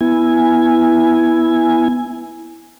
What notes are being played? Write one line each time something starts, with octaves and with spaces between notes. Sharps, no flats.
B3 E4 G#5